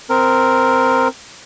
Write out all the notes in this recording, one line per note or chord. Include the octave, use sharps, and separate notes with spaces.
C4 A#4